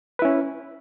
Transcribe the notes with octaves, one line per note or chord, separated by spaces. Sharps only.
C#4 E4 B4